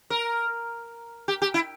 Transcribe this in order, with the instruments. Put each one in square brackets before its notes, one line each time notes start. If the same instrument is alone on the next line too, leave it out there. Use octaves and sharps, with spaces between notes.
[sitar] A#4
G4
G4
E4